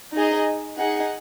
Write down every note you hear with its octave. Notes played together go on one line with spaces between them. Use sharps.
D#4 G#4 D#5
D#4 G#4 F#5